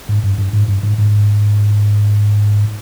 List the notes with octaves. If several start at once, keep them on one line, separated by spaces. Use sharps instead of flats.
G#2
G2
G2
G#2
G2
G#2
G#2